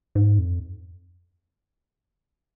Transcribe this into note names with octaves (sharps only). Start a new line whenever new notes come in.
G#2
F2